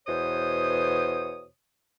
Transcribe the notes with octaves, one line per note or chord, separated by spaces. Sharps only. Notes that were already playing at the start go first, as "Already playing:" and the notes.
E2 B2 C5 C#5 D#6